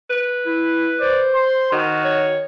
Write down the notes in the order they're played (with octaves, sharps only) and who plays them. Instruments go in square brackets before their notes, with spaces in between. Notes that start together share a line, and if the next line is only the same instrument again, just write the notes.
[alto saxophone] B4
[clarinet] E4
[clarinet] C5 [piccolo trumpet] D5
[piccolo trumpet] C6
[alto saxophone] D#3 [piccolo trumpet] F#4
[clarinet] C#5